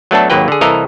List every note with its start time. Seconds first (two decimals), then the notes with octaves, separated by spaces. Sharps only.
0.11 F#3 A3 B3 D4 A4
0.30 G#1 D#2 F#3 A#3 B4 G5
0.48 D3 G#4
0.61 C2 E3 A4 A#4 D#5 F5